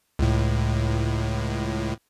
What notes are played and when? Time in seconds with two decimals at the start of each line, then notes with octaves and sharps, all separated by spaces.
0.19 C#2 A2